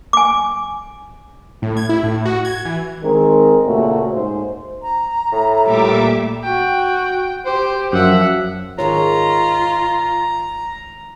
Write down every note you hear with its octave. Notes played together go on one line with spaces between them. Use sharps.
G#5 D6
A2
G#6
E4
A2
F#4
G#6
E3
D#3 G#3 C4 A#4
A#2 C#3 A3 C#4 F#4
G#2 C5
A#5
A2
A#2 G3 A3 E5 D6
F#4 G5
G4 C5
F#2 F3 E5 F#5
G#2 D#3 G#3 F4 C#5 A#5